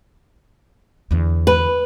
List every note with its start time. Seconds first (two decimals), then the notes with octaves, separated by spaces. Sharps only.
1.11 E2 D3
1.47 B4